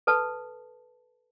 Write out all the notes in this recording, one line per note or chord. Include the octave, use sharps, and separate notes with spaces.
A4 B4 A5